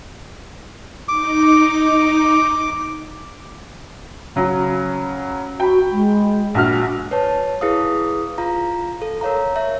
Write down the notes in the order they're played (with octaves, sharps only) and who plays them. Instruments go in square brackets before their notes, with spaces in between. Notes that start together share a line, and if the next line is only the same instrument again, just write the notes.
[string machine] D#4 [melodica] D6
[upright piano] C#3 F#3
[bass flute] F#4 [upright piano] G5 B5
[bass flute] G#3
[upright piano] A#1 F#4 F6
[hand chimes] B4 C#5 A5
E4 G#4 B4 F5 D#6
F4 F5 A#5
A4
A#4 C#5 F5 A#5
C#5 E5